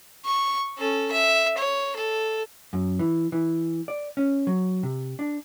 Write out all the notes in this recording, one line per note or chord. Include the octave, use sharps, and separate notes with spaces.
C#6
C#4 A4
E5
C#5
A4
F#2
E3
E3
D5
C#4
F#3
C3
D4